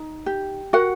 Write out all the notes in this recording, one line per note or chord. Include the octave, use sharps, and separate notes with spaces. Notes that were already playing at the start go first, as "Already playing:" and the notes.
Already playing: D#4
G4
F#4 A#4 F#5